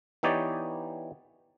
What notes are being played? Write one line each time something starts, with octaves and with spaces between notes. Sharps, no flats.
E3 B3 D#4 G4 C#5 D5